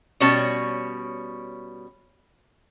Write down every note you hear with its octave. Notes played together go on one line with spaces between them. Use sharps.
B2 G3 C#4 C#5 A5